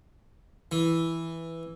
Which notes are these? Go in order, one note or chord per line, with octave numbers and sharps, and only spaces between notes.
E3